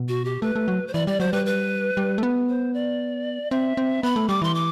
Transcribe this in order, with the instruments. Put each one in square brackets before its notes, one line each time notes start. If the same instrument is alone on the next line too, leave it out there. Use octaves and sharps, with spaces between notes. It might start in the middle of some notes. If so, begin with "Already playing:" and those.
Already playing: [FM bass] B2
[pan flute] F#4
G4
[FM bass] A3 [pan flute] B4
[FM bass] A3
F#3
[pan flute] C5
[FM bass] E3 [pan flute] D5
[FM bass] G3 [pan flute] D5
[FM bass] F#3 [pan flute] C5
[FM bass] G3 [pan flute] B4
[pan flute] B4
[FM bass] G3
A3
B3
[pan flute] C5
D5
[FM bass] C4 [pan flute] E5
[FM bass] C4
[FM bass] B3 [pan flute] B5
[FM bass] A3
[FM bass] G3 [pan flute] D6
[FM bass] E3 [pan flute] C6
[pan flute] D6